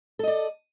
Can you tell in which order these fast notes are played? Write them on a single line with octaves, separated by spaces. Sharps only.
A4 D#5 D5